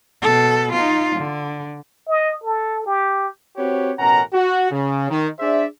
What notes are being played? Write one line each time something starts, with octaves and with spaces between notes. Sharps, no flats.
B2 A4
D#4 F4
D3
D#5
A4
G4
C4 F#4 G4 B4 C#5
A1 B2 C#4 A#4 F#5 A#5
F#4
C#3
D#3
D4 G#4 C5 D5 E5